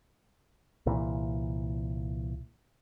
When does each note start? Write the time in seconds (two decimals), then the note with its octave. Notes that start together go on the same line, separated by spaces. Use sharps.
0.86 C2 A#2 E3